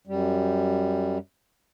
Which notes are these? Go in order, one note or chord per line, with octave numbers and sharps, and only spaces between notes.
F#2 G3